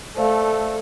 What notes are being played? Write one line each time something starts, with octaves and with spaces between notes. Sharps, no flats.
A3 A4 C5 D5 F5